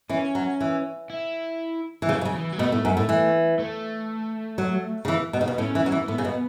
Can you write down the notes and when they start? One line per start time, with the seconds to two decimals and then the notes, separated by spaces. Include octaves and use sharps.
0.09 E3 C#4
0.35 F#3
0.60 E3
1.10 E4
2.02 E3
2.09 C#3 F#3
2.21 B2
2.25 C#3
2.35 E3
2.53 F#3
2.59 B2 A3
2.72 A2
2.85 F#2
2.97 A2
3.09 E3
3.59 A3
4.58 F#3
5.05 C#3
5.08 E3
5.33 B2
5.41 C#3
5.48 B2
5.58 A2 C#4
5.75 E3
5.86 F#3
5.92 E3
6.08 A2 B3
6.18 C#3
6.25 B2